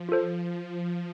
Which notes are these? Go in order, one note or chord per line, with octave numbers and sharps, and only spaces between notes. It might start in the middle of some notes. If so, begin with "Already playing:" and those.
Already playing: F3
F4 A4 C5